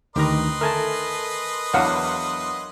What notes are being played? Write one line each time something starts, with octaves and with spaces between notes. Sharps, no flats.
D2 D#3 G4 A#4 B4 D#5 A#5 C6
A3 A#4 G#5 A5
E2 F#3 D4 F5 F#5